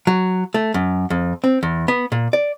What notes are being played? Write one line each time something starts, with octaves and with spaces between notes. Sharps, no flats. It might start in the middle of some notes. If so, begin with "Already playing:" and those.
F#3
A3
F#2
F2
C4
E2
B3
A#2
D5